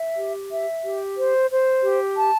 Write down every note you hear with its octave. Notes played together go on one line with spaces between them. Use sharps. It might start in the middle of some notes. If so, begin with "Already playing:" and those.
Already playing: E5
G4
E5
G4
C5
C5
G4
A5